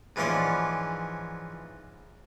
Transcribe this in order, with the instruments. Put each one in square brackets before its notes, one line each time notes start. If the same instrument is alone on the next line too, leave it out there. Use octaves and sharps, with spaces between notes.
[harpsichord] G#2 E3 F3 C#4 D5 C6